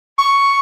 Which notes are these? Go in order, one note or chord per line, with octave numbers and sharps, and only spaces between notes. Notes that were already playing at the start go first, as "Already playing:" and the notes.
C#6